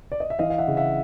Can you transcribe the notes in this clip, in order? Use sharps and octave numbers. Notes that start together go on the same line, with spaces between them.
D5
D#5
E5
E3 D#5 F5
F5
E5 F#5
C#3
E5 F#5